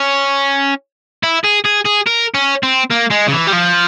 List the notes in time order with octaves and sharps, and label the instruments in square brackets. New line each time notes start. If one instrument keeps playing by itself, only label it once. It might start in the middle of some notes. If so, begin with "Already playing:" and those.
Already playing: [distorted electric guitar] C#4
E4
G#4
G#4
G#4
A#4
C#4
C4
A#3
G#3
C#3
E3
G3
F3